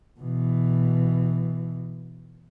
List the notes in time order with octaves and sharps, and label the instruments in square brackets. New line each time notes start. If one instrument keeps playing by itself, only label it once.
[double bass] B2 E3